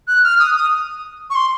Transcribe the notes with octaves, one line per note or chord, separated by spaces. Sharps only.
F#6
F6
D#6
D#6
C#6
C6